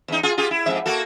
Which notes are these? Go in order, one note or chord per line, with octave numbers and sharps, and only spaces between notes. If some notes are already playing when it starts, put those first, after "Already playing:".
E2 D#4
F4 G#4
F4 G4 G#4
E4
F2 G#2 E5
A#3 F#4 A4